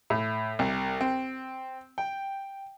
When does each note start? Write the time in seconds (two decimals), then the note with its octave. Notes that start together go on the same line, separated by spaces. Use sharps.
0.10 A2
0.59 C2
1.01 C4
1.98 G5